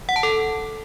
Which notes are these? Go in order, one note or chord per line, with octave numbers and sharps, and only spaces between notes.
F#5
A5
A4